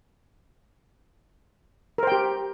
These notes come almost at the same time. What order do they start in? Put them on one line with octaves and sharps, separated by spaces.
A#4 C5 G5 G4